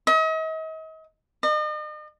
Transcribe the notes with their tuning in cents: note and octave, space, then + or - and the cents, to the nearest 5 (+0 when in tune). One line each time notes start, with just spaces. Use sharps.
D#5 +40
D#5 -40